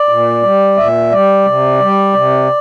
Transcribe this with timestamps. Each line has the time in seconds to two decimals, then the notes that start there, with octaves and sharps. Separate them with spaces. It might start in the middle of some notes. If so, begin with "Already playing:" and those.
Already playing: D5
0.09 A#2
0.43 G3
0.77 A#2 E5
1.12 G3 D5
1.46 C3
1.80 G3
2.14 C3